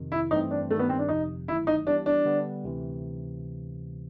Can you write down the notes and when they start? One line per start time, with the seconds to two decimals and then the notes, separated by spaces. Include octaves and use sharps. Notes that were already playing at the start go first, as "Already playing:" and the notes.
Already playing: F2 C3 D#3
0.12 E4
0.31 G2 E3 A3 C4 D#4
0.51 D4
0.70 G2 D#3 G3 A3
0.79 B3
0.89 C4
0.99 D4
1.09 G1 F2 C3 F3 D#4
1.47 G1 G2 D#3 F#3 A3 E4
1.67 D#4
1.87 E3 G3 B3 D4 E4 G4
2.06 D4
2.25 D3 G3 B3
2.64 D2 C3 E3